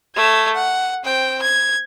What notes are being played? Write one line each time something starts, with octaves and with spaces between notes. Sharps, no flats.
A3 G#6
F#5
C4 G5
G#6